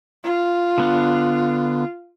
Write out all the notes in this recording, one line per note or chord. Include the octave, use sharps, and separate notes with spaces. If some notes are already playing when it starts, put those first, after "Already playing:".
F4
D3 B3 D4